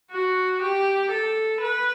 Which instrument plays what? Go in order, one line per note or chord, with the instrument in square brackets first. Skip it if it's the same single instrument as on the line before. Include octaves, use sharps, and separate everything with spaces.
[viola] F#4
G4
A4
B4